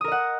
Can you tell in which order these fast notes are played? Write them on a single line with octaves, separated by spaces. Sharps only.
D#6 A#4 D#5 F#5